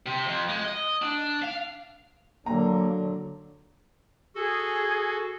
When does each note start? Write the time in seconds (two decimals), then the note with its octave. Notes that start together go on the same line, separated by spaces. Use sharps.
0.06 C3
0.26 F2
0.49 G#3
0.64 D#5
1.02 D4
1.42 F5
2.46 D3 F#3 A#3 A#5
4.35 F#4 G#4 A4